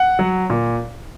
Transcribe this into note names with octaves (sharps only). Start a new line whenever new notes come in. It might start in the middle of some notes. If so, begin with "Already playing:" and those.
Already playing: F#5
F#3
A#2